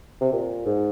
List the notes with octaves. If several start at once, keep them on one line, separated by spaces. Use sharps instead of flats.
C3
A#2
G#2